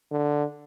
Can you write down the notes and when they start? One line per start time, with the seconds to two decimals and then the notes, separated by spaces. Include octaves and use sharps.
0.11 D3